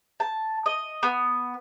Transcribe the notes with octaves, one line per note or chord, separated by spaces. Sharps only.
A5
D#5
B3